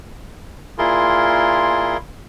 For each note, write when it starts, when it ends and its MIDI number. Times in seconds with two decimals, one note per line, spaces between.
0.78 1.97 46
0.78 1.97 64
0.78 1.97 65
0.78 1.97 68
0.78 1.97 70
0.78 1.97 84